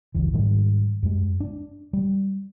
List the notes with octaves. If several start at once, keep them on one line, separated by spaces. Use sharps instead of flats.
G1 C#2 E3
G#2 D#3 G3 G#3
F#2 G#3
D4
G3